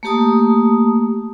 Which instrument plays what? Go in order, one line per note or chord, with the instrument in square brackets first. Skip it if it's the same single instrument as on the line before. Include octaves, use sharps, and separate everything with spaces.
[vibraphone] A3 A#3 G4 A5 D#6